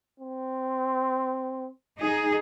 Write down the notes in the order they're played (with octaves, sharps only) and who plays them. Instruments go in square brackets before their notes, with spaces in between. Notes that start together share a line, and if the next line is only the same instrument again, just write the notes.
[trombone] C4
[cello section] D#4 G#4